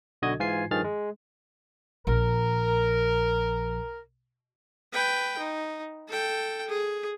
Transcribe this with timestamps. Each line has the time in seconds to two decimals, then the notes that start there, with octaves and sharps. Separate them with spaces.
0.22 B1 D3 F#4 D#5 D#6 G#6
0.39 G#2 E3 F4 G#5 G#6 C7
0.71 G2 D#3 F3 G#4 F6 A6
0.84 G#3
2.07 A#1 A#4
4.92 B4 G5
5.38 D#4
6.08 A4 G5
6.68 G#4